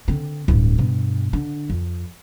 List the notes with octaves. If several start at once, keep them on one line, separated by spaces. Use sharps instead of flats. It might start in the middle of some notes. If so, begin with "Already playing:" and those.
D3 C4
D1 G2
G2 B2
D3
F2